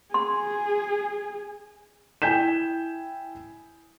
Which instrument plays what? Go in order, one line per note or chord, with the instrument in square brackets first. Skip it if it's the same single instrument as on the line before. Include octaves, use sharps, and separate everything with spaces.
[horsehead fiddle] G#4 [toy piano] C6
[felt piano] E4 G5 G#5 G6 B6 E7